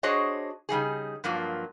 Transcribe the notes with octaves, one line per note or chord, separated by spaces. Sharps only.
D4 F#4 G#4 C5 C#5 D#5
C#3 G3 D#4 G#4
G2 F3 F#3 A#3 F4